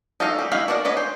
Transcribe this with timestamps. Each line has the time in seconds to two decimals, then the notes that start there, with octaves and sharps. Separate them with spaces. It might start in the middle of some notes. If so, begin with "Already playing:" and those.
0.20 D#4 F#4 A4 D#5 F5
0.39 G3
0.52 D#4 E4 F#4 F5 B5
0.68 F#4 A#4 D5 E5 F#5
0.85 D4 B4 C#5 D#5
0.97 C5